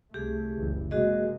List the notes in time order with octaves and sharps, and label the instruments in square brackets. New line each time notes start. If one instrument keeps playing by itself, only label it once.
[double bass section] C2 A3 [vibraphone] G4 G#4
[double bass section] F#1 C#2 E3
[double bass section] C3 G#3 A#3 [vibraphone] F#4 G#4 D#5